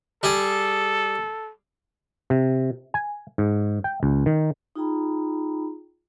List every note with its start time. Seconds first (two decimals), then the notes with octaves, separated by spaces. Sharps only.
0.23 G3 G#4 A4
2.30 C3
2.94 G#5
3.38 G#2
3.84 G5
4.03 C#2
4.26 D#3
4.76 D#4 F4 G#4 G5 A#5 B5